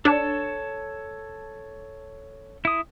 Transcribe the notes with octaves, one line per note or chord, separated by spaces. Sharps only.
D4 A4 C#5 A5
E4 D#6